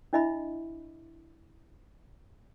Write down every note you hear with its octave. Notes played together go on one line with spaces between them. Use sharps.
D4 E4 D#5 E5 B5